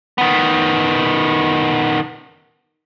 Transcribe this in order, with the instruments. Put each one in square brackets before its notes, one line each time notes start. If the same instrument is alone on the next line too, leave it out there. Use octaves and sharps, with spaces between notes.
[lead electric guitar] D#3 B3